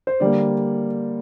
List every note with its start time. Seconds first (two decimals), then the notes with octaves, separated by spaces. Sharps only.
0.07 C5
0.20 D3 G3 A#3 D5